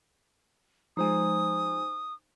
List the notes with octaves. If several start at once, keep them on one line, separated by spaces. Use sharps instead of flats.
F3 G#3 D#4 C5 G#5 D#6